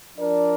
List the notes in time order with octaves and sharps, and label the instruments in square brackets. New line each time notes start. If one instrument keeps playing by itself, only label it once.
[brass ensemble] F3 D4 A#4 D5